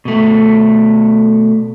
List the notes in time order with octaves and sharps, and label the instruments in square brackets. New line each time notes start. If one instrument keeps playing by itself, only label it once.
[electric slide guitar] B2 A3